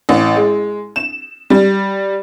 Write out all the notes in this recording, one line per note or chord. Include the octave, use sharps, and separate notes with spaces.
A1
G#3
E7
G3